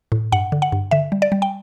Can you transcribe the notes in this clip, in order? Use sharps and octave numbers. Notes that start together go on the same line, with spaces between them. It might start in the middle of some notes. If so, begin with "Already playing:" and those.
A2
G2 F#5
D3
F#5
G2
D3 E5
G3
D5
G3
G5